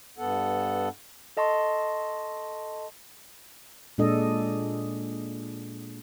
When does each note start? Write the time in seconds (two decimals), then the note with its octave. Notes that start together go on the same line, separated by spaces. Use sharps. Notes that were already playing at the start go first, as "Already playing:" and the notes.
0.18 G2 B3 A4 F#5
1.37 A4 D#5 A5 C6 C#6
3.98 A#2 G#3 D4 A4 D#5